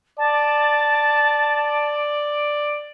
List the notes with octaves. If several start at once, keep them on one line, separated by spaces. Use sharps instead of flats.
D5 A5